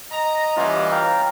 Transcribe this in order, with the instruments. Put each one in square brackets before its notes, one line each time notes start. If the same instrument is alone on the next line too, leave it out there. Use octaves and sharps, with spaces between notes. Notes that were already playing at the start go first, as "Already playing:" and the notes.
[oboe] D#5 [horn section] A#5
[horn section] E3 G3 [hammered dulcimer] C#4 F4
[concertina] F5 G5 A#5